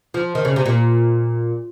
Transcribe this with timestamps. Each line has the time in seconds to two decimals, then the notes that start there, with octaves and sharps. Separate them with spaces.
0.14 F3
0.35 D#3
0.45 C#3
0.56 C3
0.66 A#2